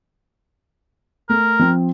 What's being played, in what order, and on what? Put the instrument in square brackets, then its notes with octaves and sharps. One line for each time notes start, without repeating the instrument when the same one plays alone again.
[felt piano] A3 [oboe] A#4
[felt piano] F3 C4